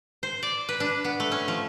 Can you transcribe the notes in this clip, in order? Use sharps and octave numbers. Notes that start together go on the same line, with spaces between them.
C5
D5
B4
D4
B3
A3
C#4
F3